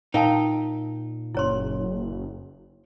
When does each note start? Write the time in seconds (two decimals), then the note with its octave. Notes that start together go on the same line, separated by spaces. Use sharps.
0.14 A#2 D#4 A#4 F5 G5 A5
1.35 F#1 E4 C#5 C6